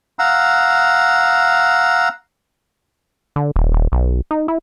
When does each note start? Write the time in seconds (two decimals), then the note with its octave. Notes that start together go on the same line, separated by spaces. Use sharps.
0.19 F5 F#5 A#5 E6
3.36 D3
3.56 D#1
3.72 D#1
3.92 B1
4.31 D#4
4.48 E4